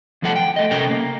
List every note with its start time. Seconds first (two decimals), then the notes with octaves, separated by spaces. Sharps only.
0.22 E2 F3 A3 A4 F#5 A5
0.36 G5
0.56 A3 D#5
0.71 C3 C#4 A4 A#4 G5
0.91 A#3